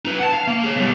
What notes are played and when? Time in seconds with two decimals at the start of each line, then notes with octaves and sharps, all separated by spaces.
0.05 D#4 B4
0.19 F#5 A5
0.33 F5
0.48 A#3
0.64 G#4 C#5
0.75 B2 G3